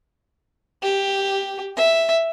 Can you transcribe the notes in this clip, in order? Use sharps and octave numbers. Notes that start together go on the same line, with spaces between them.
G4
E5